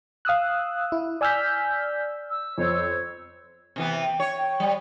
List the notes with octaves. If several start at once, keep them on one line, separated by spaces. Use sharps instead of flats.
F5 D#6 E6 F#6
E4
D5 G#5 E6 F6 G6 B6
E6
F2 C5 C#5
C3 E3 B3
G5
C#5
G5
G3